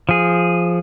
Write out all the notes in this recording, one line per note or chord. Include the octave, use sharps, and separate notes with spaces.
F3 G#4